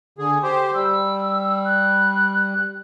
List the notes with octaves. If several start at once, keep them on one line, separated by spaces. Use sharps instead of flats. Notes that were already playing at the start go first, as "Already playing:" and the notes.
D3 G#4
G4 C5
G3 E6
F#6